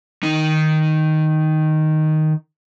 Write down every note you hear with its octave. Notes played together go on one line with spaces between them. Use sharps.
D#3 D#4